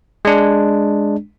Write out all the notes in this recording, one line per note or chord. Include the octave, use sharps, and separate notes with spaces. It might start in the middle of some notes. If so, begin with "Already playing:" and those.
G#3 D4